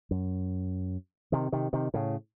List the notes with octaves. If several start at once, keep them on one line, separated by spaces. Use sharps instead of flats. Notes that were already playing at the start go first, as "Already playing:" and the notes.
F#2
C3 D#3
C3 D#3
C3 D#3
A2 C#3